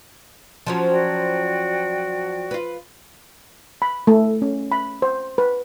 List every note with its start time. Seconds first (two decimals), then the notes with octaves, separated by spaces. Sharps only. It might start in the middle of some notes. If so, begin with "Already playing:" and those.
0.66 F3 F#3 C#4
0.91 F#4 D5 G5
2.51 F4 B4
3.82 B5
4.07 A3
4.42 C#4
4.72 B5
5.02 C5
5.38 B4